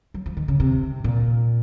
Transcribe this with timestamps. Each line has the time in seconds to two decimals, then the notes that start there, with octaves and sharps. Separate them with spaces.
0.14 F#3
0.26 F3
0.37 D#3
0.48 C#3
0.60 C3
1.04 A#2